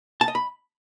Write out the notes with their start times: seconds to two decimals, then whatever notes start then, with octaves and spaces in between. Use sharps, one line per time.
0.21 A5
0.28 D#5
0.35 B5